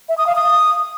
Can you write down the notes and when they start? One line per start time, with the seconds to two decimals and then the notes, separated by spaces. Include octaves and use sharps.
0.09 E5
0.18 D#6
0.27 F5
0.35 D#6